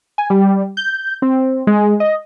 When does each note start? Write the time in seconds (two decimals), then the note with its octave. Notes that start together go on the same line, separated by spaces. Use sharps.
0.18 G#5
0.30 G3
0.77 G6
1.22 C4
1.67 G#3
2.00 D#5